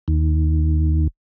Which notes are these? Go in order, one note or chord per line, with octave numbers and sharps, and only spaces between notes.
D#2